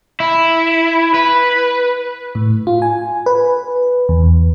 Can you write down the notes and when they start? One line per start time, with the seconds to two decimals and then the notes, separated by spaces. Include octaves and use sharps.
0.20 E4
1.14 B4
2.35 A2
2.67 F4
2.82 G#5
3.26 B4
4.09 E2